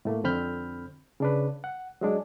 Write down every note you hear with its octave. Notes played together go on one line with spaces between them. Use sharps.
A2 A3 A#3
F2 D3 C4 B5 F6 G6
C#3 D4 B4
F#5
F#3 G#3 D4